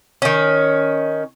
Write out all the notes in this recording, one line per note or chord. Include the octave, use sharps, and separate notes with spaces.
D#3 C#4